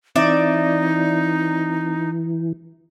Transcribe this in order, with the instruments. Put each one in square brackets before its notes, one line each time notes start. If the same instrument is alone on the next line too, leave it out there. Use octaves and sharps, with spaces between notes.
[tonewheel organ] E3 [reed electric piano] C4 [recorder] D#4 [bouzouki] D5 E5